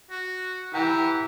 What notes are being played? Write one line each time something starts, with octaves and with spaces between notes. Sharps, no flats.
F#4
E3 G4 F#5 G5 A#5